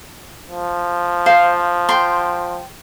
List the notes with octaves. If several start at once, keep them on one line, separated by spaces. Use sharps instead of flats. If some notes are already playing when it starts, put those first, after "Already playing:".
F3
C5 F5
G5 C6